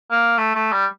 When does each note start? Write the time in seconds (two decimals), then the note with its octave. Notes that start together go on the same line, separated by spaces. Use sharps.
0.11 A#3
0.38 A3
0.55 A3
0.72 G3